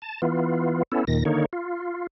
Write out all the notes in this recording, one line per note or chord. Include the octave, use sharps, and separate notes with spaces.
A5
E3 B3 F4
B3 C#4 E4 A4
D#2 A#2 D#3 A#6
D3 D#3 A#3 D#4 C#5
F4